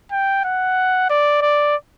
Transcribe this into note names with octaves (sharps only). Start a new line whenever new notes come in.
G5
F#5
D5
D5